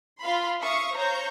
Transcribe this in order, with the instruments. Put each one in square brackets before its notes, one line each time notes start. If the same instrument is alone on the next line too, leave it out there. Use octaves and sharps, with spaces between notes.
[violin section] F4 F5 B5 C6
E5 F5 C#6 D#6 C#7
C5 C#5 F5 A#5 C#6 G6